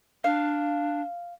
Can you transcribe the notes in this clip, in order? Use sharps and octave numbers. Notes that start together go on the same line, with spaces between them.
D4 F5